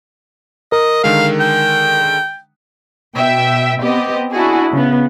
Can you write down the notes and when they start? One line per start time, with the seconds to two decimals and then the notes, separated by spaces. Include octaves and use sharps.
0.72 A#4 D#5
1.04 D3 D#3 G#3 F5
1.40 G5
3.16 B2 E5 G5
3.81 B3 C4 G4 D#5
4.32 D4 E4 F#4 G#4
4.73 C#3 B3